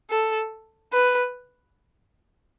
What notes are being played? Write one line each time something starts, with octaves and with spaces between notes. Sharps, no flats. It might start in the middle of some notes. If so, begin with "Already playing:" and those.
A4
B4